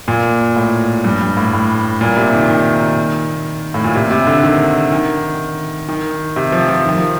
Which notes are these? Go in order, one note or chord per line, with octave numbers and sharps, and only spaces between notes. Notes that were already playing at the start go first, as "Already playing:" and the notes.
A#2
A2
G2
G2
A2
A2
A#2
C3
D#3
D#3
A2
A#2
C3
C3
D3
D#3
D#3
D#3
C3
F3
F3
D#3
F3